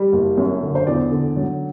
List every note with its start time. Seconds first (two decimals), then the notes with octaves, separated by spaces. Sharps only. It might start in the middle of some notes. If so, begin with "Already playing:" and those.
Already playing: G3
0.12 F#1
0.37 F#2
0.62 D3
0.75 C5
0.87 E2 D5
1.12 D3
1.37 F#3